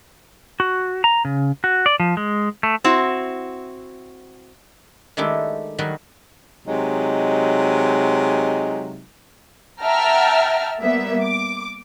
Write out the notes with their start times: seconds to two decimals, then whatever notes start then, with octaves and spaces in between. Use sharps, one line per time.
0.60 F#4
1.04 A#5
1.25 C#3
1.64 F#4
1.86 D5
2.00 F3
2.17 G#3
2.63 A3
2.84 C4 E4 F#4
5.17 D#3 G#3 A3 D4 E4 G4
5.78 D#3 F#3 G3 F#4
6.66 C3 F#3 G#3 D#4
9.82 E5 F#5 G5 A5 A#5 F6
10.81 G3 A#3 B3 E5
11.22 D6